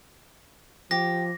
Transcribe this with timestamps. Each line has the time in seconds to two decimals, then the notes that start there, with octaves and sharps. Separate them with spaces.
0.91 F3 G4 A#6